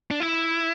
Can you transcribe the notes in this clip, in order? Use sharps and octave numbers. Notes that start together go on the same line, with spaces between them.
D4
E4